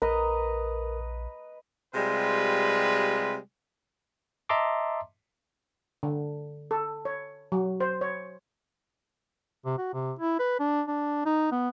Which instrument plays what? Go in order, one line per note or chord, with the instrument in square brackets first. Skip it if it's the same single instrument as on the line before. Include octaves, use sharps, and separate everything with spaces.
[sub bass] A#1 [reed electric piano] A#4 [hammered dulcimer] B4 D#5 A#5
[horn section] C3 G3 G#3 F4 B4
[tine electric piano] D#5 E5 A5 A#5 C6 D6
[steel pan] D3
A4
C#5
F#3
C5
C#5
[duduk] C3
F#4
C3
E4
B4
D4
D4
D#4
B3